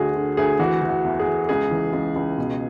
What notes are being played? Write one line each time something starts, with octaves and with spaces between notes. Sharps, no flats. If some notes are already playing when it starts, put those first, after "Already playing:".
Already playing: D2 D3 F#4 G#4
D3
D2 G#4
E3 F#4
E3
F#4
E2
G#4
E2
C#2 G#4
E3
C#2
C#2
B2